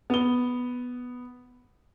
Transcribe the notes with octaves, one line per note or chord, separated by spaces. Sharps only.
B3 G7